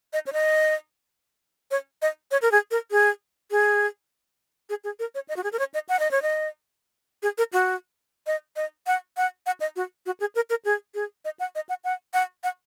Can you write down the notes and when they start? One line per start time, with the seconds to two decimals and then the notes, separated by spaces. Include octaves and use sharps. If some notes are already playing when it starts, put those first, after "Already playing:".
0.13 D#5
0.27 C#5
0.33 D#5
1.71 C#5
2.02 D#5
2.31 C#5
2.42 A#4
2.52 G#4
2.71 A#4
2.91 G#4
3.51 G#4
4.69 G#4
4.84 G#4
4.99 A#4
5.15 C#5
5.29 D#5
5.36 F#4
5.44 G#4
5.53 A#4
5.59 C#5
5.74 D#5
5.89 F#5
5.99 D#5
6.11 C#5
6.22 D#5
7.23 G#4
7.38 A#4
7.53 F#4
8.27 D#5
8.56 D#5
8.87 F#5
9.17 F#5
9.46 F#5
9.60 D#5
9.76 F#4
10.06 F#4
10.20 G#4
10.35 A#4
10.50 A#4
10.65 G#4
10.94 G#4
11.25 D#5
11.40 F#5
11.55 D#5
11.69 F#5
11.84 F#5
12.14 F#5
12.43 F#5